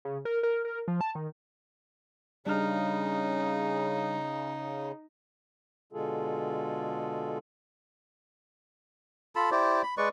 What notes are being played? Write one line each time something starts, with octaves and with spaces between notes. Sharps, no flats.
C#3
A#4
A#4
A#4
F3
A5
D#3
C#3 G3 D4 D#4 F6
B2 D3 G#3 F4 G#4 A4
F4 A4 A5 B5
E4 G4 C5 D5
B5
G#3 B4 D5 C#6